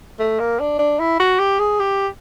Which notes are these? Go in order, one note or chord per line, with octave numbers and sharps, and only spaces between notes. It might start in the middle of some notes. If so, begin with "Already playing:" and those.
A3
A#3
D4
D4
E4
F#4
G4
G#4
G4